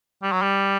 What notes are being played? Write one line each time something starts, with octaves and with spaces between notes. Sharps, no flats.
G3
F#3
G3